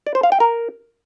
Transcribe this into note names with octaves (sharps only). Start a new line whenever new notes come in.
D5
C5
F5
G5
A#4